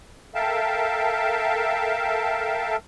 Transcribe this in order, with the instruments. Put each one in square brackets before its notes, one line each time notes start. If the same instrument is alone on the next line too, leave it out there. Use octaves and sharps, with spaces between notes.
[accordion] A4 A#4 E5 F5 G5 A5